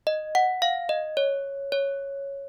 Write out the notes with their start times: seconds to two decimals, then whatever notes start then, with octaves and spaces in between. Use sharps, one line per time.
0.07 D#5
0.35 F#5
0.62 F5
0.89 D#5
1.17 C#5
1.72 C#5